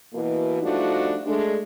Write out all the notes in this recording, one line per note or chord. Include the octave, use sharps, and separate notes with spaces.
B2 E3 A#3
F3 G3 A3 D4 D#4 F#4
G#3 A3 D4